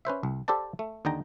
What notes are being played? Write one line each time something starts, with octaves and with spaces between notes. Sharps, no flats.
C#4 B4 C5 E5
C2
G4 A4 C5 D5 A5
A3
D#2 D3 D#4 G5 A#5